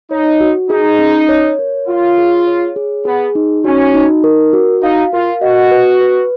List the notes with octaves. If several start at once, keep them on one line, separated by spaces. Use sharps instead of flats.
D#4 C#5
F#4
D#4 G#4
C#4
C#5
A#4
F4 C#5
G#4
C#5
G#4
B3 G#4
D#4
C#4 F#4
D#4
A#4
F#4
D#4 F5
F4 A#4
F#4 D#5
B4
B4